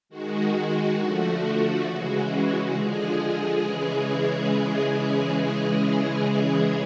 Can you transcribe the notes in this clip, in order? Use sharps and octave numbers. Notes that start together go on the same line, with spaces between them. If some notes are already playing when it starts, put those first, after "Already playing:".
D#3 G#3 F#4
D3 F3 A3
C#3 E3 G#3 F#4
D3 F3 G#3 G#4
C#3 E3 G#3
G#4